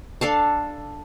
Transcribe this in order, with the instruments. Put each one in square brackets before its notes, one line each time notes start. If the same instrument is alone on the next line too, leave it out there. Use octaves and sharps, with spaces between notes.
[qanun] D4 A4 F5 A5